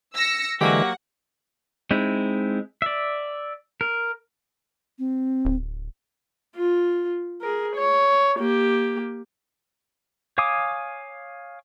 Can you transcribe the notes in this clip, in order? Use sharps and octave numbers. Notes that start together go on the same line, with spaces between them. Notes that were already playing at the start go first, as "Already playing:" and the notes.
E6 A#6 C#7
D3 E3 F#3 G#3 A#3 F#4 G4 F#5
G#3 C4 D#4 E4
D5 E5
A#4
C4
D1
F4
G#4 A#4
C#5
A#3 G4
C#5 F5 G#5 D6 D#6